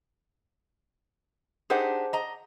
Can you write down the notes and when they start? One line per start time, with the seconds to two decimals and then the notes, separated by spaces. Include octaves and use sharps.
1.70 D4 D#4 G4 G#4 C5 F#5
2.13 D#5 A#5